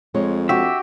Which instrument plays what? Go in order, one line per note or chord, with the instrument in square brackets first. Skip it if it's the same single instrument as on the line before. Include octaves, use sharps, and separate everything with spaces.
[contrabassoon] F2 [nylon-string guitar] G#3 C#5
[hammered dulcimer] F#4 G4 [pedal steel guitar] E5